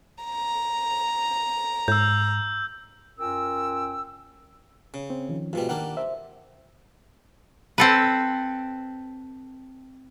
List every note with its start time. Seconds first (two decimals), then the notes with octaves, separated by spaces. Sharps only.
0.23 A#5
1.88 G#2 E6 G6
3.19 F#2 C#4 F4 A#4 G5 E6
4.94 C#3
5.10 C4
5.29 D#3 F3 C#4
5.53 G#2 B2 G3 F4
5.69 D#3 G3 A#3 D4 F#5
5.97 C5 E5
7.78 C4 A4 B4